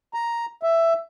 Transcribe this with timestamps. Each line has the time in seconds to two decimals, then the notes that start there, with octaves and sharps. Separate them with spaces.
0.14 A#5
0.63 E5